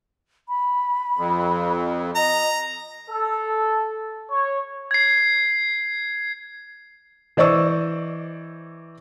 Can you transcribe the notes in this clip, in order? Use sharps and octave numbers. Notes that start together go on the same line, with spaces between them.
B5
F2
D#5 A#5
A4
C#5
G#6 C7
E3 C5 D5 D#5 C#6 E6